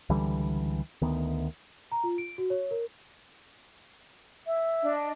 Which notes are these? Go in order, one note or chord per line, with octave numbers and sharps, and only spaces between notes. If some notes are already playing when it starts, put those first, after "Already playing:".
C#2 D3 E3 G3
D2 D#3 B3
A#5
F4
D7
F#4
C#5
A#4
E5
D4 D#5